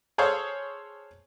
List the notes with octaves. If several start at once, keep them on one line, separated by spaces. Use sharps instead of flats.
G#4 A4 C5 C#5 F5 C#6